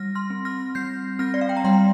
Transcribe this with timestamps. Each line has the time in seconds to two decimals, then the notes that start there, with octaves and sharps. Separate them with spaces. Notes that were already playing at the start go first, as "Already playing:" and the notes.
Already playing: G3 F6 A#6
0.15 C6 F6
0.30 C4
0.45 F6 A#6
0.75 G3 G6 C7
1.19 C4 F6 A#6
1.34 D5
1.41 F5
1.49 G5
1.57 A#5
1.64 G3 G5 C6